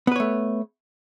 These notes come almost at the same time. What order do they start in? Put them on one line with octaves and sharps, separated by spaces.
B3 B4 C#5 A3